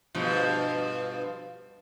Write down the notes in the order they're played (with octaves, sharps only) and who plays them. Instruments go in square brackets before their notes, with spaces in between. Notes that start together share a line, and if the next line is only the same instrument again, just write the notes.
[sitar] G2 B2 F3